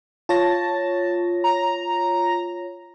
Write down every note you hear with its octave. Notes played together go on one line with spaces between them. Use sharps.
F4 C#5 A5 A#6
A#5